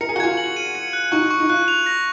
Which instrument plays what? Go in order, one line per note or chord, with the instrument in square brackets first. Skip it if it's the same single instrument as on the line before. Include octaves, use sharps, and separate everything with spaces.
[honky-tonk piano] A#4 [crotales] C#7
[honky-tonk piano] G#4
F#4
[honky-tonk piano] F4 G#4 [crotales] G#6
[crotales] F#7
D#7
C#7
F#6
[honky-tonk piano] D#4 F#4 [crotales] C#6
[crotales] C#6
[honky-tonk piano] D#4
[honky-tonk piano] F4 [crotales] F#6
[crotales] F7
A#6